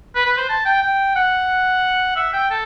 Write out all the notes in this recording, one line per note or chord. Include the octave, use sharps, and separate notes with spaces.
B4
B4
C5
A5
G5
G5
F#5
E5
G5
A4